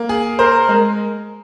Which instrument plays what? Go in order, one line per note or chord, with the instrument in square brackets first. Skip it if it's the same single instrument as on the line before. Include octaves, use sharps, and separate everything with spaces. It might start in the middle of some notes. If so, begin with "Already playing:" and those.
Already playing: [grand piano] A#3
G#4
[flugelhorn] A#4 [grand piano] C5
[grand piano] G#3